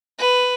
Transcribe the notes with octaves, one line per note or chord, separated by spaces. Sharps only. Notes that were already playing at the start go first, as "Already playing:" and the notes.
B4